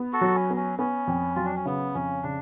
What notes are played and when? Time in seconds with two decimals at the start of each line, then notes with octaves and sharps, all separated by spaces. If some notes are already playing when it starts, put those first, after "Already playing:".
Already playing: B3
0.13 F#4 A4
0.21 F#3
0.35 C#4
0.50 B3
0.56 C#4
0.79 B3 C#4
1.07 F2
1.36 F#3 F4
1.45 D4
1.56 C#4
1.65 C#3 B3
1.94 F2 C#4
2.23 C#3 D4